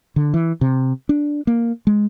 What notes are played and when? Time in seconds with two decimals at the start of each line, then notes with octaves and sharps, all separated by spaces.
0.16 D3
0.34 E3
0.61 C3
1.09 D4
1.47 A#3
1.87 G#3